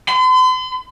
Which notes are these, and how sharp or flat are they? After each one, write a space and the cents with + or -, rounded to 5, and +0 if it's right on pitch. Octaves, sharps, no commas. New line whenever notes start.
C6 -45